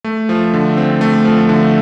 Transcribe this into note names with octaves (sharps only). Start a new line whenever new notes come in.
A3
F3
D3
C4
A3
F3
D3